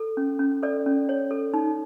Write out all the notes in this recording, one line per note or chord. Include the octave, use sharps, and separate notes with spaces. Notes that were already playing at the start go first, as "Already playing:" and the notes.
Already playing: A4
C#4
C#4
A4 D5
C#4
C#5
A4
D#4